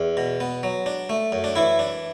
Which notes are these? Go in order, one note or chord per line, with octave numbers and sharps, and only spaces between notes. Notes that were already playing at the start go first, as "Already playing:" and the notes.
Already playing: E2
B2
B3
F#3
D4
A3
F#2
D4
E3 E4
D4